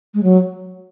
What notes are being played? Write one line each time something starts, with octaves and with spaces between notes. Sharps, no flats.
G#3
F#3